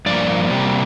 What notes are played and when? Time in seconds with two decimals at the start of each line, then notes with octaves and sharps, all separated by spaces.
0.06 G2 F3 A#3 D5
0.50 C3 G3 A#3